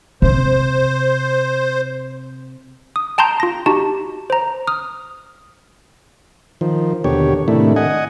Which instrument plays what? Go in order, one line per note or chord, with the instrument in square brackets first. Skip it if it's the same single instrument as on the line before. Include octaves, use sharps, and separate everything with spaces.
[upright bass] C3 [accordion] C5
[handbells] D#6
G5 A5 A#5 C6 G6
F4 A#6
D#4 F#4 G4 A5
C5 A#5
D#6 F6
[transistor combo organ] D#3 F3
D#2 B2 D3 G4 C#5
A2 C3 D#3 A3 D4 E4
D#5 F#5 G#5